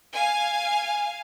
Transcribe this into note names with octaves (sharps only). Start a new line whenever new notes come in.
F5 G#5